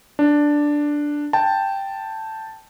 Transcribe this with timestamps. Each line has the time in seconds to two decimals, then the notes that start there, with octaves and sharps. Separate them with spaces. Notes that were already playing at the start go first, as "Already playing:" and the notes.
0.19 D4
1.33 G5 A5